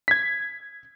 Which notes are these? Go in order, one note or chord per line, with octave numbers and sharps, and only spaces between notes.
G#6 B6